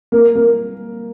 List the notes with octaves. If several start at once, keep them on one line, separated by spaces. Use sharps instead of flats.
A#3
A#3